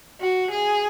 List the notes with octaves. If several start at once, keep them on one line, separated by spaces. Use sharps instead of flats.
F#4
G#4